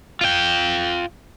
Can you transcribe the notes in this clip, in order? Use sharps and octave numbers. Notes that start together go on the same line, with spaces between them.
F4 G5